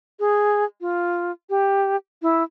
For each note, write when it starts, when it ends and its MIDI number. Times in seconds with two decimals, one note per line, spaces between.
0.20 0.64 68
0.81 1.31 65
1.50 1.96 67
2.22 2.43 64